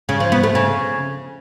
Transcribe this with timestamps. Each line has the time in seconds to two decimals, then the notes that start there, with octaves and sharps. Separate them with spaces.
0.09 C#3
0.20 F3
0.32 B3
0.43 A3
0.55 C#3